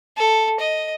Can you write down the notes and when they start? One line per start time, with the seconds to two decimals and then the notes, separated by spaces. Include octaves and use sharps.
0.17 A4
0.60 D#5